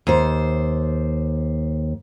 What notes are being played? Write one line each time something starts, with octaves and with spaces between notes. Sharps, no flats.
D#2 C5